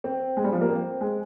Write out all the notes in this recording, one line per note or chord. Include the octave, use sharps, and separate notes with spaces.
C4
G#3
G3
F3
A#3
C4
G#3